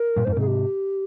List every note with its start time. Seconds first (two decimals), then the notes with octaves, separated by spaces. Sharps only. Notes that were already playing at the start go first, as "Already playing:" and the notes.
Already playing: A#4
0.16 G2 A#2
0.25 F2 G#2 C5
0.32 A#4
0.37 G#2 C3 G#4
0.47 G4